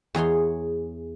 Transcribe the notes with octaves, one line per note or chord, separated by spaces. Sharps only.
E2 G#4 C#5 C6